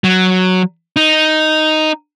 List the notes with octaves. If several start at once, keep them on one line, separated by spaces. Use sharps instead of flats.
F#3
D#4